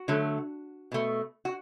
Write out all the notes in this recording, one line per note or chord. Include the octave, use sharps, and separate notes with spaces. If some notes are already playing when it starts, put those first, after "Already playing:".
Already playing: F#4
D3 F#3 A3
B2 A3
F#4